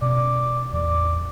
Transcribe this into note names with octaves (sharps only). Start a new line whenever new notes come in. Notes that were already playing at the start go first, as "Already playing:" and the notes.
B2 C#4 D5
A1 E2 D5